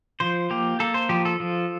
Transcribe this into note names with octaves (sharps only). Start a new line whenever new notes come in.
F3 C5
A#3 G4
A#3 A4
C5
F3 G4
A4
F3